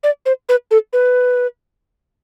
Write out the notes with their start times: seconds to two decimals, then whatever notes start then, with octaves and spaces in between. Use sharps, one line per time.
0.03 D5
0.26 C5
0.49 B4
0.71 A4
0.93 B4